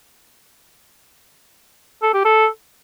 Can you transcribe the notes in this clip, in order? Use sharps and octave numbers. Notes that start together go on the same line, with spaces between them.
A4
G4
A4